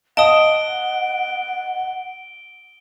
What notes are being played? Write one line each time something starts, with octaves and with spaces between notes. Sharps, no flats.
D#5 F5 F#5 A5 D#6 D7 G7